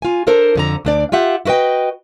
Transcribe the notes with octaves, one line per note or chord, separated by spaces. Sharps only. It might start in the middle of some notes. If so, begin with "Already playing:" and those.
F4 G#5
D4 A4 A#4 C5
F2 D3 A#5
D2 D4 D5
F4 G4 E5 F#5
E4 F#4 B4 D#5 G5